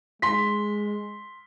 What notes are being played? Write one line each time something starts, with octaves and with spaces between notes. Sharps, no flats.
G#3 C6 B6